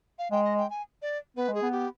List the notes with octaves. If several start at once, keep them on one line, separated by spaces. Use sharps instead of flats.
F5
G#3 G5
D#5
G5
G#5
D5
B3 B4
G#3
G#4
B3
G4